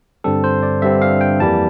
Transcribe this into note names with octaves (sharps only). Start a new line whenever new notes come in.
G2 D3 G3 C4 A4
C5
D5
G2 D3 G3 C4 E5
F5
G5
F2 E3 G3 A#3 A5